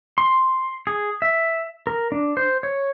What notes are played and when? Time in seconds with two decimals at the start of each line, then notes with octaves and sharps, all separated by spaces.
0.18 C6
0.87 G#4
1.22 E5
1.87 A#4
2.12 D4
2.37 C5
2.63 C#5